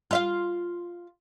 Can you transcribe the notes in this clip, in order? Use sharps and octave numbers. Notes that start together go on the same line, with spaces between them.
F4 E5 F5